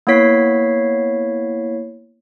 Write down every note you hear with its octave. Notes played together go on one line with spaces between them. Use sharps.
A#3 B3 E4 C#5 B6 C7